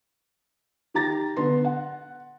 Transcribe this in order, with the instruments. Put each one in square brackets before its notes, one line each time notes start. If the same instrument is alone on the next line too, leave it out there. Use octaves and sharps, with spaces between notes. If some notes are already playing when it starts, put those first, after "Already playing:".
[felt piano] D#3 G4 A#5 A6 A#6
D3 B3 C6
F#5